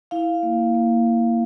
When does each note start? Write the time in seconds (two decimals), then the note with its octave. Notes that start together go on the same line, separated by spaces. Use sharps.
0.11 E4 F5
0.43 A#3
0.75 A#3
1.07 A#3